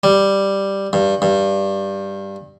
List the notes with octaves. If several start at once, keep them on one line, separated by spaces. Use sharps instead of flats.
G3
G2
G2